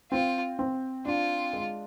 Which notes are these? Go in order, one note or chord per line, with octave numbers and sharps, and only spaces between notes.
C4 F4
C4
D4 F4
G#3